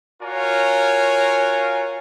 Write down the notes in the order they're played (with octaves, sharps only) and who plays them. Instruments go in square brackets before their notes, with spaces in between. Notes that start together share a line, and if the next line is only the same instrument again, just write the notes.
[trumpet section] F4 F#4 A#4 C#5 G#5